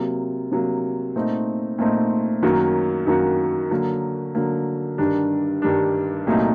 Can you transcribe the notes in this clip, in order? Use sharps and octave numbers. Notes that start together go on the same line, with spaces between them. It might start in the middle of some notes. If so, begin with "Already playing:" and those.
Already playing: C3 F#3 A#3
C3 F#3 A#3
A#2 A3 C4 D#4
A#2 A3 C4 D#4
F#2 D#3 F#3 A#3 F#4
F#2 D#3 F#3 A#3 F#4
D3 F#3 A#3
D3 F#3 A#3
G2 D#3 G3 D4
G2 D#3 G3 D4
C2 A#2 F#3 A3 D#4